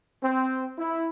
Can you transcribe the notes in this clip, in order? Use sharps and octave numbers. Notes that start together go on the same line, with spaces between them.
C4
E4